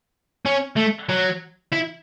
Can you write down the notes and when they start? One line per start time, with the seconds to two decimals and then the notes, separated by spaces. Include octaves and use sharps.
0.46 C#4
0.77 A3
1.09 F#3
1.72 E4